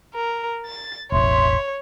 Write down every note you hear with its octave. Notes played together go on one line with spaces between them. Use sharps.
A#4
A6
E1 A1 C#5 E5 C6